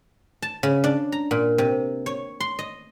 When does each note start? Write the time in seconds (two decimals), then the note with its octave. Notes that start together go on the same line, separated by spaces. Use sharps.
0.42 A5
0.63 C#3
0.84 D4
1.12 A#5
1.31 A#2
1.58 C3
2.06 C#5
2.40 C6
2.59 D#5